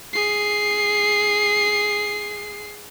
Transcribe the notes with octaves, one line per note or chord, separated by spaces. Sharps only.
G#4 C7